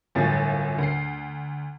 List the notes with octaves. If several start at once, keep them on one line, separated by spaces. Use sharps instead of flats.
G1 F#2 A2 F3 A6
D2 C7